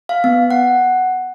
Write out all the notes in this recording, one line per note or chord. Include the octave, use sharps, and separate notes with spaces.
F5
B3
F#5